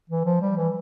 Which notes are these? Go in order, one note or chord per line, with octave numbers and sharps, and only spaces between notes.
E3
F3
G3
E3